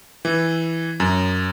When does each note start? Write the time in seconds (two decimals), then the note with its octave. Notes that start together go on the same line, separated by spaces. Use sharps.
0.25 E3
1.00 F#2